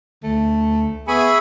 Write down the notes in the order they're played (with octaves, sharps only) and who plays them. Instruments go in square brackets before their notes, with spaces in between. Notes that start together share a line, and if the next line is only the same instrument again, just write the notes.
[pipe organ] D2 [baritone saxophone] A3
[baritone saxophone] B3 [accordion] G#4 G#5 B5 [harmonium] E5 [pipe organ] C#6 D#6